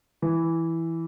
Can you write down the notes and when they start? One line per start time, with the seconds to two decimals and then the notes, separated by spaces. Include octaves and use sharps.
0.22 E3